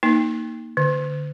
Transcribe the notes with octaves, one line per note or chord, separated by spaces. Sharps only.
A#3 D#4
D3